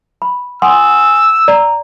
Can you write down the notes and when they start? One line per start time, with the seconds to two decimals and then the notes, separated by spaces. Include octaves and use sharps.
0.22 B5
0.62 F#5 G#5 C6 D#6 E6
1.48 D5 A#5